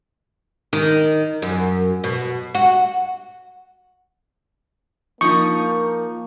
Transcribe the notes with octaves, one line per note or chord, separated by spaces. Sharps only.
D#3
F#2
B2
F#4
F3 A#3 D#4 C#6